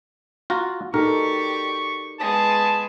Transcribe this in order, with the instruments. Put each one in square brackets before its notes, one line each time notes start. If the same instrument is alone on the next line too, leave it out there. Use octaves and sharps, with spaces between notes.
[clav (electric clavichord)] F4 F#4 A#5
[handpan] D#4 F#4 A4 [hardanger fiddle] G4 D5 [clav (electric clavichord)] A#4 [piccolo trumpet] C#6
[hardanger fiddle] G#3 B3 [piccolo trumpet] A5